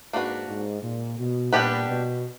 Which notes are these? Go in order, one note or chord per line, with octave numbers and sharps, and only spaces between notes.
G#2 A#3 D4 F#4 B4
G#2
A#2
B2
A#2 G3 B3 D4 G4 B4
B2